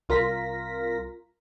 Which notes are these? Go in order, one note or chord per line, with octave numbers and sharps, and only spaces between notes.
C2 F4 A#4 A#6 B6